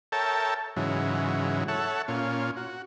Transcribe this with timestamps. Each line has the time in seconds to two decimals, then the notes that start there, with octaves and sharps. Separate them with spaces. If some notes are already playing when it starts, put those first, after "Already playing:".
0.12 A4 A#4 C#5 E5 G5 A5
0.76 G#2 C#3 E3 F#3
1.68 A4 C#5 E5 F#5
2.08 A#2 C#4 F4
2.57 F#4